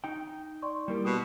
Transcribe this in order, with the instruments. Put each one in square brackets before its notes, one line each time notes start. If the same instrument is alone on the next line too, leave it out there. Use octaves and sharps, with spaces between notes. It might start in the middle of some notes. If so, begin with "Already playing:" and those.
[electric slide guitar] D#4 G5
[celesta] D5 C6 C#6
[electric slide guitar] G3 A#3 G4 [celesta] E4 A#4
[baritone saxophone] B2 [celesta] D#6 E7